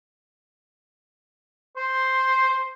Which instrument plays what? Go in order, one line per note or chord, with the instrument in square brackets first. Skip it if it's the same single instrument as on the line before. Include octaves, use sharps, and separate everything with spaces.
[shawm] C5 [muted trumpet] C6